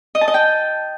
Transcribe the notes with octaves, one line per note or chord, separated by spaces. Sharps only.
D#5
A5
D#5
G5